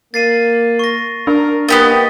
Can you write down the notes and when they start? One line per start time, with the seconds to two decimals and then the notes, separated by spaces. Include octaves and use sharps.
0.14 A#3 A6 C7 D#7
0.79 C#6 A#6
1.27 D4 A#4
1.69 A#3 B3 G4 D#5 A6